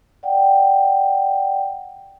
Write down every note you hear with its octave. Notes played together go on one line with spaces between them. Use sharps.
D5 F#5 G5